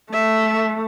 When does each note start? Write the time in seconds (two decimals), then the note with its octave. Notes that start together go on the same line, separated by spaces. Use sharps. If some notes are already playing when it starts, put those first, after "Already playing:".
0.12 A3 E5